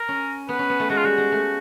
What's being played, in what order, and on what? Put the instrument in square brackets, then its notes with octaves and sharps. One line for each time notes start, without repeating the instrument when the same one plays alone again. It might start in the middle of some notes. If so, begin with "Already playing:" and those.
Already playing: [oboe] A#4
[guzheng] C#4
[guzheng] B3 [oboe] B4
[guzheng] C#4
B3
A3
[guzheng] G#3 [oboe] F#4
[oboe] F4
[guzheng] G3 [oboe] F#4
[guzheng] G#3
A3